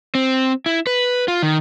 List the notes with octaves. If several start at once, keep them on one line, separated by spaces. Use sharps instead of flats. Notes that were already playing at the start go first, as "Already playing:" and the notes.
C4
E4
B4
F4
D#3